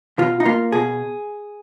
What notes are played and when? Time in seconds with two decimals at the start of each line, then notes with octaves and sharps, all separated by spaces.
0.18 B2 F4
0.40 D#4
0.45 A#3 F4
0.72 B2 G#4